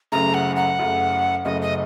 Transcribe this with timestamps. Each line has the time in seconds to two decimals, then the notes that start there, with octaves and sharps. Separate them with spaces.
0.12 F#1 F#2 C#3 A3 A#5
0.34 F#5
0.56 F#5
0.78 F#1 F#2 C#3 A3
1.45 F#1 F#2 C#3 A3 D#5
1.62 D#5